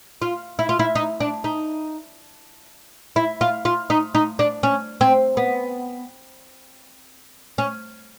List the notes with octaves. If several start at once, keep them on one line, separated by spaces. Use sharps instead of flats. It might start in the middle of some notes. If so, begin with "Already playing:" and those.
F4
E4
F4
E4
D#4
D4
D#4
E4
F4
F4
D#4
D#4
D4
C#4
C4
B3
C#4